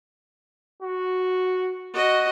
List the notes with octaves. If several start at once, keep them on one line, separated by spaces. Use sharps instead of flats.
F#4
F#4 D#5